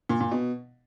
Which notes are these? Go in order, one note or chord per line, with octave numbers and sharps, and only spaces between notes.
A#2
A#2
B2